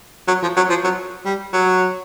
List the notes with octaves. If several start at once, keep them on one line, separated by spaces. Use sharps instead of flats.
F#3
F3
F#3
F3
F#3
G3
F#3